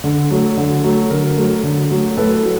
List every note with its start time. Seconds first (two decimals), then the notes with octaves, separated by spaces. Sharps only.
0.04 D3
0.31 F#3 A3
0.57 D3
0.84 F#3 A3
1.10 D3 A#4
1.37 F#3 A3
1.63 D3
1.90 F#3 A3
2.17 A2 A4 B4
2.44 F#3